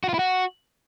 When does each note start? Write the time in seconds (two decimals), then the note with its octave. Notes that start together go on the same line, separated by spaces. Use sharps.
0.04 F#4
0.09 F4
0.14 E4
0.19 F#4